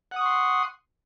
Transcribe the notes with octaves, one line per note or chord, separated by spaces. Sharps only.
F#5 C6 C#6 D#6